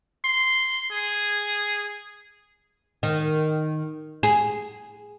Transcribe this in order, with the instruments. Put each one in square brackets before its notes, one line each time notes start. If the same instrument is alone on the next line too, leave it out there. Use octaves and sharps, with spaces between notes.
[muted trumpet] C6
G#4
[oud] D#3
G#4